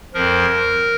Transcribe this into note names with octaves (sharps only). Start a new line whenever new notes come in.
F2 F3 A#4